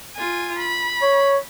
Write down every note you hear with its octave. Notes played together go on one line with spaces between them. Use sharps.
F4 G#5
B5
C#5